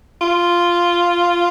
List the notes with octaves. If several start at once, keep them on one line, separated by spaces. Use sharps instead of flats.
F4